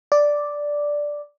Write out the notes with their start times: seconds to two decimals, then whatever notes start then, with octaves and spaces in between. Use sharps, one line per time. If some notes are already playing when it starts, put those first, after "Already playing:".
0.12 D5